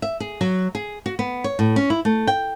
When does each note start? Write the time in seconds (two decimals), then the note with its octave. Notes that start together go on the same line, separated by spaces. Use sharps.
0.02 E5
0.20 G#4
0.41 F#3
0.75 G#4
1.06 F#4
1.19 B3
1.44 C#5
1.59 A2
1.76 C#4
1.90 E4
2.05 A3
2.27 G5